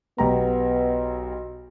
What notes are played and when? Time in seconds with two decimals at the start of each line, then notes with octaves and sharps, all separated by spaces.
0.18 B1 B3 G4 A#5